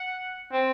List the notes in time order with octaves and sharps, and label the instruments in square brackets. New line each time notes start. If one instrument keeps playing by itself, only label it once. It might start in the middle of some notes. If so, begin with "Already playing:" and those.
Already playing: [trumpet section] F#5
[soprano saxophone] C4